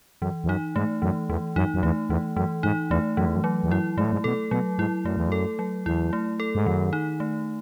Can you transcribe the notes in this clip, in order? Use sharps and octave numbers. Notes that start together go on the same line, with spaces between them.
F#2 E3
E2
F#2 D#4
G#2 A3
F#2 E3
E2 E3
F#2 D#4
F#2
E2 A3
E2 E3
F#2 E3
G#2 D#4
E2 A3
F#2 E3
E2
F#2
F#3
E2
F#2 E4
G#2 A3
A2
G#2
B2 A4
B2 F#3
G#2 E4
F#2 A3
E2
F#2 A4
F#3
E2 E4
A3
A4
G#2
F#2 D#3
D#4
A3